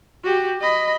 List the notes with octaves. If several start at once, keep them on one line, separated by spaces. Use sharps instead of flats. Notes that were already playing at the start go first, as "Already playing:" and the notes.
F#4 G4
D#5 B5